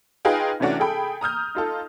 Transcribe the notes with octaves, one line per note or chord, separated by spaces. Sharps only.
D#4 F4 G#4 B4 F5 G5
C3 E3 A3 C#4 D4 F#4
G#4 A4 G5 B5
A#5 D#6 F6 G6
D#4 F4 A4